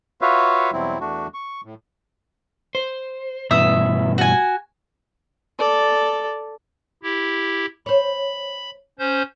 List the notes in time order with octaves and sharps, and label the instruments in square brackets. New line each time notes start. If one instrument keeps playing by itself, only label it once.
[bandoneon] F4 F#4 B4 C#5 E5 F5
E2 B2 F#3 G3 C4 E4
E2 A3 D4 F#4
C#6
A2
[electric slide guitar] C5
[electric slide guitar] G2 B2 E3 [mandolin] E5 D#6
[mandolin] F#4 G#5
[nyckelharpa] A4 D5
[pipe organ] E4 G4
[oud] C5 C#5 [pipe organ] B5
[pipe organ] C#4 C5 G6